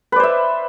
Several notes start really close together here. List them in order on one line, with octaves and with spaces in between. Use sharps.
B4 D5 C5 E5